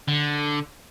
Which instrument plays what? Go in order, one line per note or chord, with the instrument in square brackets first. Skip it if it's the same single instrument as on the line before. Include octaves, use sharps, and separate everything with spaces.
[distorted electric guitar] D3